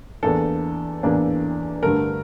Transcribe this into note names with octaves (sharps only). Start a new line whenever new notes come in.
E2 E3 A#3 D4 A4
E2 E3 A#3 D4
G2 D3 A3 A#4